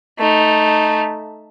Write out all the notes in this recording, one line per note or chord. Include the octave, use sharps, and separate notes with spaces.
A3 D#4